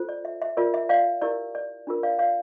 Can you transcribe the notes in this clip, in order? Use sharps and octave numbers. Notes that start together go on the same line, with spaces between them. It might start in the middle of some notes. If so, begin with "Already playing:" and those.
Already playing: F4 A4 C5
D5
E5
E5
F4 A#4 D5
E5
D5 F5
E4 G4 A#4 D5
D5
D4 F4 A#4
D5 F5
D5 F5